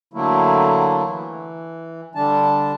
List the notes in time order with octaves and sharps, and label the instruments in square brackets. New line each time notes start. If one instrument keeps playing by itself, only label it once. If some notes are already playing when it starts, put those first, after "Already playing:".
[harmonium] D3 F#3 A3 A#3 E4
E3
D3 G3 D4 A5